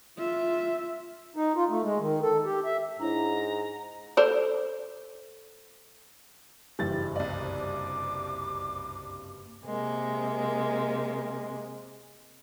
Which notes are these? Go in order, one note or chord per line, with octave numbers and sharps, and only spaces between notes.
F4 E5
D#4
F4
A3
G#3
D#3
A4
G4
E5
G#2 D4 E4 C#5 A#5
A4 C5 D5
F#1 G2 E3 G3 A6
C2 D5
D6
C3 G#3 A#3